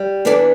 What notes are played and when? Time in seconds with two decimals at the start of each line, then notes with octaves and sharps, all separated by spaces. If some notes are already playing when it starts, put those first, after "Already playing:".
Already playing: G3
0.25 E2 E3 B3 D4 A4 D5